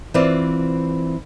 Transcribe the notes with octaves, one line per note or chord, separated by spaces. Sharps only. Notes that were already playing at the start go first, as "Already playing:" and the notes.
E3 C4 F4 B4 C5 D5